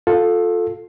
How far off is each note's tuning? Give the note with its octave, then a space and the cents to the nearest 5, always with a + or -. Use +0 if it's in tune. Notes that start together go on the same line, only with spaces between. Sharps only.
F4 +20 A4 +0